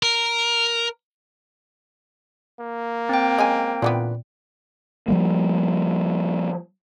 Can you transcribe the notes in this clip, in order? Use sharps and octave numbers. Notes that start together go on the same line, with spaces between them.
A#4
A#3
C4 G5
G#3 C#4 G#5
A#2 D3 E3 B3
F3 G3 A#3